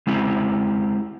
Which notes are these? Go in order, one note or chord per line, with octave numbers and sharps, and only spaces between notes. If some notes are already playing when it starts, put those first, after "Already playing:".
G#3 C4 E4 G4